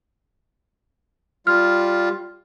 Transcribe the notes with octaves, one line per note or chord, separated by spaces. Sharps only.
G3 F4 F6